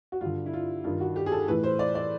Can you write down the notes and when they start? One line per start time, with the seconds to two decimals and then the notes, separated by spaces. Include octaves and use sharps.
0.12 F#4
0.21 G2 D3 F4
0.46 E4
0.53 F4
0.84 G2 D#3 F4
1.01 F#4
1.16 G4
1.26 G#4
1.32 A4
1.48 A2 E3 B4
1.64 C5
1.79 D5
1.95 D5